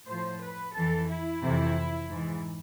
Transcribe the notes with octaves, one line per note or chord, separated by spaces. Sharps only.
A2 F3 C5
B4
F2 E3 A4
E4
F2 C3 E3
G#2 E3